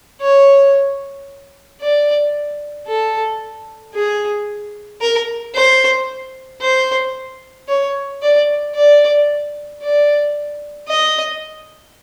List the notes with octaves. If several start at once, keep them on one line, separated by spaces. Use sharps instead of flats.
C#5
D5
A4
G#4
A#4
C5
C5
C#5
D5
D5
D5
D#5